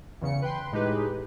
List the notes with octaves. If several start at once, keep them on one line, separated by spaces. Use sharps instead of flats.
E2 C#3 C#7
B4 G5 C6
A2 G#3 D#4 G4 B4